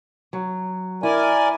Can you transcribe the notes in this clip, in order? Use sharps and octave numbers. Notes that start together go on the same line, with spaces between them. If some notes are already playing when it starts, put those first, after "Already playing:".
F#3
E4 A#4 D5 G#5